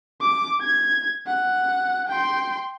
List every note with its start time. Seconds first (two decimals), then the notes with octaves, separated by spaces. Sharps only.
0.21 D6
0.61 G#6
1.26 F#5
2.08 G5 C6